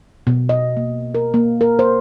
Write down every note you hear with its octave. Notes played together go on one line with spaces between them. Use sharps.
B2
D#5
A#3
A#4
A#3
A#4
C5